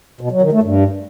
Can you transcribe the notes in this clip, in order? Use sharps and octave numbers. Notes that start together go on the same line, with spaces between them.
B2
F#3
D#3
A3
G2